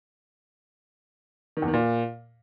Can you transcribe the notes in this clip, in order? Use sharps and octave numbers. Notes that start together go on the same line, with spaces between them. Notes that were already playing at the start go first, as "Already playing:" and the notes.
D#3
E2
D#3
A#2